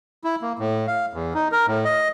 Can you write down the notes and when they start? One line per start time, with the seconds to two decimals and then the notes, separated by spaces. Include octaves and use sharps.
0.24 E4
0.42 A#3
0.59 A2
0.87 F5
1.13 E2
1.34 D#4
1.52 A#4
1.67 A2
1.85 D#5